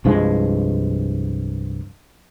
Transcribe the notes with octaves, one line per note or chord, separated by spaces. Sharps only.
C2 G2 F3 G#3